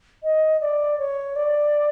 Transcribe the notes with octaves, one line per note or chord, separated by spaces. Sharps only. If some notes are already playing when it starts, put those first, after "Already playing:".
D#5
D5
C#5
D5